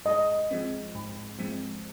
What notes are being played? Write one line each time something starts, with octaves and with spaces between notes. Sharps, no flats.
G#2 D#5
F3 G#3 C4
G#2
F3 G#3 C4